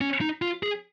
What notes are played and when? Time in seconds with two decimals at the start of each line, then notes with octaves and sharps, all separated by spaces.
0.01 C#4
0.21 D#4
0.42 F4
0.63 G#4